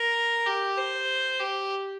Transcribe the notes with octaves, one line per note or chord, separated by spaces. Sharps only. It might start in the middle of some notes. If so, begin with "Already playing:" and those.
Already playing: A#4
G4
C5
G4